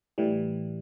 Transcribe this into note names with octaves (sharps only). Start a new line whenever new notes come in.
A2 E3 G3